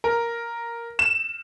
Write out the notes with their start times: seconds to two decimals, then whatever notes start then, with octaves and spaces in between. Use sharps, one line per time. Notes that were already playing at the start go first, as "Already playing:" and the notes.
0.04 A#4
0.99 E7